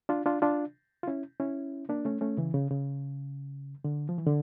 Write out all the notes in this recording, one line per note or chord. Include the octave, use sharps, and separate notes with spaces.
D4 F4
D4 F4
D4 F4
F4
C#4 E4
C#4 E4
A#3 D4
A3 C#4
A3 C#4
C#3 E3
C#3
C#3
D3
F3
E3
D3